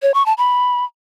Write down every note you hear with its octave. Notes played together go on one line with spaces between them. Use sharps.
C#5
C#6
A5
B5